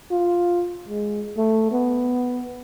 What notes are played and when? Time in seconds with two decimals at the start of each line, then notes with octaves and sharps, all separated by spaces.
0.11 F4
0.89 G#3
1.37 A3
1.72 B3